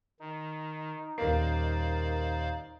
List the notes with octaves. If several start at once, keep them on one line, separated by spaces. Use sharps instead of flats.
D#3 D#4
D#1 A#3 C5 D5 F5 C7